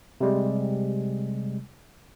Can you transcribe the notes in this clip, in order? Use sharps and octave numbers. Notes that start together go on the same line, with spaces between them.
C3 G3 G#3